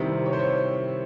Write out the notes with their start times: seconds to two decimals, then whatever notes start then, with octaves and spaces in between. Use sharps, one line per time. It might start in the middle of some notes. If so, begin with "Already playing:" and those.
Already playing: C3 D#3 G3 C4 E4
0.26 C#5
0.33 C5
0.39 C#5